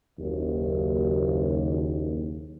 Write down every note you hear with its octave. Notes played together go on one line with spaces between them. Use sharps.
F#1 D#2